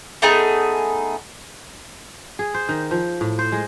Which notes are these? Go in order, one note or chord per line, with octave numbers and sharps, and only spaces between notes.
A3 B3 D#4 G#4
G#4
C5
D#3
F3
A2
C5
G#3